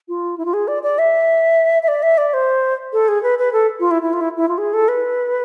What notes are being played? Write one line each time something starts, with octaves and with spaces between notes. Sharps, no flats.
F4
E4
F4
G#4
D5
D5
E5
E5
D5
E5
D5
C5
A4
G#4
B4
B4
A4
F4
E4
E4
F4
E4
E4
F4
G#4
A4
B4